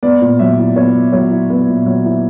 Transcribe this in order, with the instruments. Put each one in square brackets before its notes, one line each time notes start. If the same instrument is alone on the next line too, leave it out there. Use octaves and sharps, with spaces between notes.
[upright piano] B3 D5
A#2
F#3 E5
E4
B3 C#5
A#2
F#3 C#5
E4
B3 B4
A#2
F#3
E4